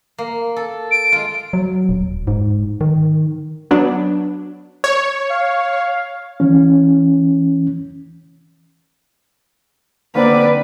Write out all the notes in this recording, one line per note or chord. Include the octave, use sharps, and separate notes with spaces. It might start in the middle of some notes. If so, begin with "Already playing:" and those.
A#3
A4
D7
G#3 F4
F#3
D#1
G#2
D#3
F#3 B3 D4
C#5
F5
E3 C#4
D3 A#3 C4 B4 D5